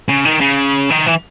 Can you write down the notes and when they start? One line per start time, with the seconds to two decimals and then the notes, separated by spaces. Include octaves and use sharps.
0.09 C#3
0.25 D#3
0.40 C#3
0.90 D#3
1.06 E3